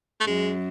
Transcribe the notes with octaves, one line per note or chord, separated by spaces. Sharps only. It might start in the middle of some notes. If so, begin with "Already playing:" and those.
A3
F#2 G#3